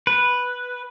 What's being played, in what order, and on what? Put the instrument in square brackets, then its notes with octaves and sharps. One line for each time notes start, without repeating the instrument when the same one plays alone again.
[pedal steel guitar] B4